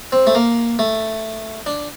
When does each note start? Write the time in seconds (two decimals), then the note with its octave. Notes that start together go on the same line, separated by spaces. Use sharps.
0.12 C4
0.27 A3
0.35 A#3
0.79 A3
1.66 D4